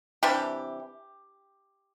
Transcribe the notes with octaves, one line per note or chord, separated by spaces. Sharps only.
C3 E3 G3 D4 G4